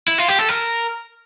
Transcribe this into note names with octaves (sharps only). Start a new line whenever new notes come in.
E4
F4
G4
A4
A#4